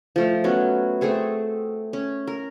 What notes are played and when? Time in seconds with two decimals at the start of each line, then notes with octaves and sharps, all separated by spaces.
0.16 F3 A3 F5
0.44 F#3 B3 C#4 F#4
1.01 A3 C4 G#4 A4
1.93 C#4
2.27 A#4